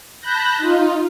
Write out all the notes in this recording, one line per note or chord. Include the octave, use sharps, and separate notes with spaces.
A5 B5 F#6 G6 A#6
D#4 F4